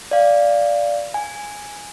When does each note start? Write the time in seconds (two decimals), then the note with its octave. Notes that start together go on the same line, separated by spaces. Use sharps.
0.11 D5 F5
1.14 G#5